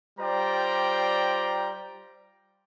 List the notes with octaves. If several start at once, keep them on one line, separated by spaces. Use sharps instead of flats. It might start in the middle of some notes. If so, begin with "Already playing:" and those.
G3 F4 C5 D5 G5 A#5